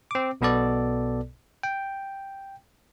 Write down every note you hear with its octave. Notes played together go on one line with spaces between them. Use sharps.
C4 D6
B1 B2 B3 A4 D5
G5